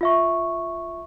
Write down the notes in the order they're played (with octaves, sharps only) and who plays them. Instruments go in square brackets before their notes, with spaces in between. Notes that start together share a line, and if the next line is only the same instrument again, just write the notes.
[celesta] F4 E5 C#6